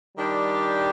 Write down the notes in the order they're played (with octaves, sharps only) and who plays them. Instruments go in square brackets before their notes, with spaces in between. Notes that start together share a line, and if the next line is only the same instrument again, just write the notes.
[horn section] D#3 G3 D4 G4